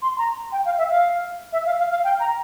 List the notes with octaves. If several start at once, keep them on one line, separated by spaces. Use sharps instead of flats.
C6
C6
A#5
G5
F5
E5
F5
E5
F5
F5
F5
G5
A#5